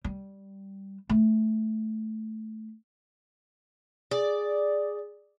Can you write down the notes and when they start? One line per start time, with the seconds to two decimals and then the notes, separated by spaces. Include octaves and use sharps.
0.04 G3
1.09 A3
4.11 G#4 D5